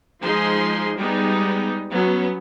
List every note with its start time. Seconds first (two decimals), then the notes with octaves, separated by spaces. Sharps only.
0.23 F3 G#3 D#4 G#4 C6
0.98 G3 G#3 B3 D#4
1.90 F#3 B3 C#4